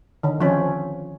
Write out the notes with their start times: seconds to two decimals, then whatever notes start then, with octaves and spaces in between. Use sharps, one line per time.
0.23 D3 D#3
0.40 F3 C4 C#4